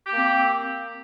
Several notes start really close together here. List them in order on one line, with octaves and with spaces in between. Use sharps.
G4 A#3 C4